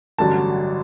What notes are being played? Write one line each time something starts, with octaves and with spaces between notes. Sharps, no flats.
A1 G2 D3 F#3 A5